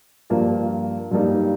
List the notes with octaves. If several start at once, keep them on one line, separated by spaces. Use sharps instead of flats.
G2 F3 A#3
G2 G3 A#3 D#4